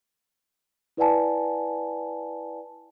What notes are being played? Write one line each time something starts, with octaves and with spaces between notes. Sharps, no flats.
E4 B4 D5 F#5 G#5 A5